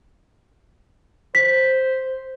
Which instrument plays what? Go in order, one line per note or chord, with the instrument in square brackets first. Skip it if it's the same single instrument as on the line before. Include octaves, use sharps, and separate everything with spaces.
[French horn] C5 [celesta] B6